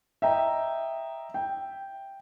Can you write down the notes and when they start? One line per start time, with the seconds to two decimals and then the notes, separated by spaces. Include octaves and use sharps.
0.22 D#5 E5 G5 A#5
1.34 G5